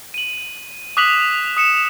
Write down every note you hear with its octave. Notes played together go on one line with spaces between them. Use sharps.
D#7 F#7
D6 D#6 F#6 B6 F7 F#7
D#6 C#7 E7